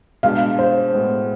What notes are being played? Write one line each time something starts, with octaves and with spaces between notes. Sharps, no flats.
B2 G#3 D4 F5
C5
A2 G#3 B3